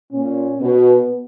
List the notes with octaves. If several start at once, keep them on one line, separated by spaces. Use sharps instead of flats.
A#2 C#4
B2 B3